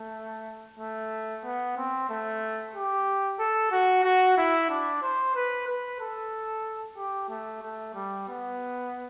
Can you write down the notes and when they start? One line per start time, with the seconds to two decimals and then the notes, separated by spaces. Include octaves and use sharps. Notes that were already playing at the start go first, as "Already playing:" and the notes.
Already playing: A3
0.79 A3
1.44 B3
1.77 C4
2.09 A3
2.75 G4
3.39 A4
3.72 F#4
4.04 F#4
4.37 E4
4.69 D4
5.02 C5
5.35 B4
5.67 B4
6.00 A4
6.97 G4
7.29 A3
7.63 A3
7.94 G3
8.28 B3